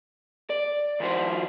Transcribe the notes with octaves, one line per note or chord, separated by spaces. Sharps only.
D5
D#3 F3 E4 F#4 C5